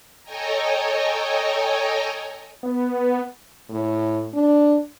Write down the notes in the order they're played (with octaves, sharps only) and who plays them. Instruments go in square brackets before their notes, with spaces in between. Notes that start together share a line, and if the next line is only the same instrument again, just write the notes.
[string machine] A4 C#5 D#5 G5 G#5 A#5
[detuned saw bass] B3
[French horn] A2
D4